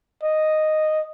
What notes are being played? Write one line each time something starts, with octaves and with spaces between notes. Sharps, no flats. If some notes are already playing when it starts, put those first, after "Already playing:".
D#5